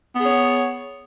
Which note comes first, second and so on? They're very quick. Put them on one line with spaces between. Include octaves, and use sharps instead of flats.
B3 G#4 C#5